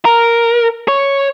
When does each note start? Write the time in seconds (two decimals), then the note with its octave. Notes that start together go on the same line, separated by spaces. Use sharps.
0.05 A#4
0.88 C#5